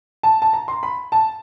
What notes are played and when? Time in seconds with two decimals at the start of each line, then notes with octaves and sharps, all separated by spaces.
0.23 A5
0.42 A5
0.53 A#5
0.68 C6
0.83 B5
1.12 A5